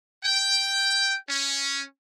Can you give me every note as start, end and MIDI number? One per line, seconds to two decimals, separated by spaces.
0.23 1.15 79
1.28 1.80 61